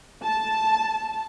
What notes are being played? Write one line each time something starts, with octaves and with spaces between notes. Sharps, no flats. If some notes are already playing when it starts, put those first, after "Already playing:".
A5